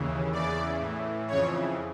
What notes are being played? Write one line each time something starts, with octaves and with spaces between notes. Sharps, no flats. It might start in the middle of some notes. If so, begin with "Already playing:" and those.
Already playing: D#2 C#3 E3
E2 C#3 E3 D5
A2 E3
F2 C#3 E3 C#5